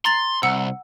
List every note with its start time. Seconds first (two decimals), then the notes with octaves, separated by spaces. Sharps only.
0.05 A#5 C6 A6 F#7
0.43 C2 F#5 E6 C#7